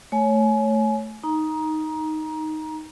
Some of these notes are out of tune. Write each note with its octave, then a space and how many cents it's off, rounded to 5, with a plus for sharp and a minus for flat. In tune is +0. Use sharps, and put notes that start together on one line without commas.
A3 +0 C#5 +0 G#5 +25
D#4 +0 A#5 +20